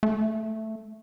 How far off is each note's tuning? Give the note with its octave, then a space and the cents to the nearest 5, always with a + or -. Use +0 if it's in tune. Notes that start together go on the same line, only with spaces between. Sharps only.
A3 +0